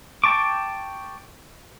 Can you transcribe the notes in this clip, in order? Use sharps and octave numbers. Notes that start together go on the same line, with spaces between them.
G5 A5 C#6 D6